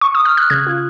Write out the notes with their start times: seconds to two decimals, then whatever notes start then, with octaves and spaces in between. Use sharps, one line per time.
0.01 C#6
0.15 D#6
0.25 F6
0.37 F#6
0.50 C#3 G#6
0.67 F4